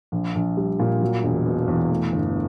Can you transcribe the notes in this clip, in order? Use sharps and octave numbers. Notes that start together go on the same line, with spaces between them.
A#1
A#1
G3
A#2
F#3
E1
B2
E2
A3
G1